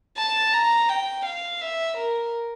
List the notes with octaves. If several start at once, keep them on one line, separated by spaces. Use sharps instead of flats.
A5
A#5
G5
F5
E5
A#4